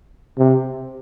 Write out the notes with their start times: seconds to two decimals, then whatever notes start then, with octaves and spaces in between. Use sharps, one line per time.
0.38 C3